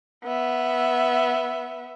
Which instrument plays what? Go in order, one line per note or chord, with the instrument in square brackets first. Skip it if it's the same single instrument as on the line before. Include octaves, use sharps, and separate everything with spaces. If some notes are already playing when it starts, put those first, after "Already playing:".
[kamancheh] B3 E5